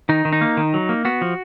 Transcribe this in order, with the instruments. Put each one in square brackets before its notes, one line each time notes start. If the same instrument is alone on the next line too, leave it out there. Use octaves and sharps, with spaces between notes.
[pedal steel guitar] D#3 D#4
D#3
D#4
A#3
D#3
F#3
A#3
B3 F#4
F3